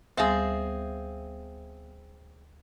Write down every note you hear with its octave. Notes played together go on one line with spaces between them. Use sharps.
D2 G3 B3 C4 G#4 E5 F5